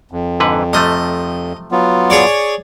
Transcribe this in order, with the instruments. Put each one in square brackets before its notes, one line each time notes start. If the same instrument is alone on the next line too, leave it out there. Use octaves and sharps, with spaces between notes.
[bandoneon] F2
[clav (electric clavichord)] G#2 D3 B4
[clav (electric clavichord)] C3 F3 A3 [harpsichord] D#5
[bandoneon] F#3 B3 F4
[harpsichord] G#4 C#5 D5